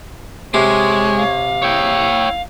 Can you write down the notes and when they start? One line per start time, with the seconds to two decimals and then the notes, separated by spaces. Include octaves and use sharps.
0.54 C3 G#3 C#5
1.17 F5
1.62 E4 C#5 G5